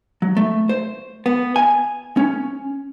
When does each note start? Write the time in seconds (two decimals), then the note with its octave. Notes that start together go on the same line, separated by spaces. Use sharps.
0.22 F#3
0.37 A3
0.69 C5
1.26 B3
1.56 G#5
2.17 C#4